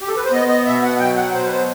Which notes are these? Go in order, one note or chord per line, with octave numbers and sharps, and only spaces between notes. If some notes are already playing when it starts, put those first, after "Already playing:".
G4
A4
B4
C5
B3 D#5
D#5
B2 E5
F#5
F#3 G5
F#5
B2 C5
B4
C5